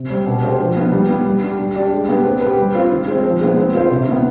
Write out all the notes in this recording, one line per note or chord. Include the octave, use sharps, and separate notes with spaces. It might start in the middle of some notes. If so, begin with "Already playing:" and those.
Already playing: C3
G3 C4
B2
G#3 D4 G4 C5
F3
B3 D#4
G3
B3 D#4
G3
D4 G4
G3
D4 G4 D5
G#3
B3 D4 G4 B4
C4
G4 B4
G3
C4 F4
D#3
G#3 C4
F3
G#3 B3 D#4
C4
F4 C5
C3
D#3 B3